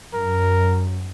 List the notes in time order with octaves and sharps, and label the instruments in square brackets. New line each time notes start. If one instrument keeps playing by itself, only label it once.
[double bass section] F#2 [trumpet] A#4